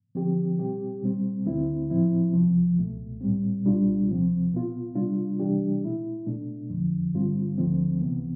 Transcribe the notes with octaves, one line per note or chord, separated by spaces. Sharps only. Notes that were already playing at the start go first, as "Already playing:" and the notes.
D3 F3 C4 G4
B2 G3 C4 G4
B2 G3 C4
D2 D3 A3 C4 E4
A2 F3 C4 E4
C2 C3 F3
C2 B2 A3
A2 G3 C4
C2 B2 G3 D4 F4
D2 C3 F3 C4
B2 B3 F4
C3 G3 D4 F4
C3 E3 G3 D4 G4
B2 A3 E4
B2 A3 D4
F2 D3 F3
G2 D3 G3 C4 F4
D2 D3 F3 A3 C4
C2 C3 E3 B3